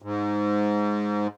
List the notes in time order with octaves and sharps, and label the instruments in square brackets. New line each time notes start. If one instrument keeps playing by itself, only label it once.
[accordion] G#2